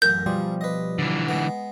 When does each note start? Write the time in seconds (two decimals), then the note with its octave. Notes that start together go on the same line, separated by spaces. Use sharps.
0.02 A1 F#2 A#4 G6
0.26 B2 F3 G3 G#4
0.61 B4 D#5
0.99 D3 E3
1.28 G#3 B3